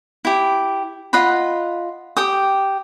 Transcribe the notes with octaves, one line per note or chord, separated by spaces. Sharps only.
E4 G4
F4 D#5 F#5 B5
G4 G5 D#6